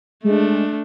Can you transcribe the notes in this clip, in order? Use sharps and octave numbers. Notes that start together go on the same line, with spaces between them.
G#3 A3 D4